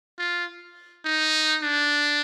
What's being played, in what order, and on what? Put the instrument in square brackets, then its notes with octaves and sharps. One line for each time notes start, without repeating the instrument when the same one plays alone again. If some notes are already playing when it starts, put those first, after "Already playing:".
[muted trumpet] F4
D#4
D4